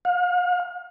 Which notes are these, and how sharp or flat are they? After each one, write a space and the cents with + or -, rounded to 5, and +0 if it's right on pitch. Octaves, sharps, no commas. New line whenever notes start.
F5 +40